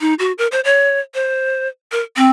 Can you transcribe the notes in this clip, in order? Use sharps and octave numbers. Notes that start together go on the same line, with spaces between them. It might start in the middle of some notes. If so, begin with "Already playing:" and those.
D#4
F#4
A#4
C5
C#5
C5
A#4
C4